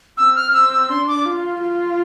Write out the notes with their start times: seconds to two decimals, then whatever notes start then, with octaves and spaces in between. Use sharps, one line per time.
0.17 C4 E6
0.36 F6
0.54 C4 E6
0.71 E6
0.89 D4 C6
1.08 D6
1.25 F4
1.61 F4